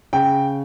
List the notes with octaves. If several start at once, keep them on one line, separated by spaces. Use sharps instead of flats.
C#3 G5